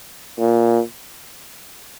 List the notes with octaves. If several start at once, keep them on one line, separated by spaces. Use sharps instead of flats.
A#2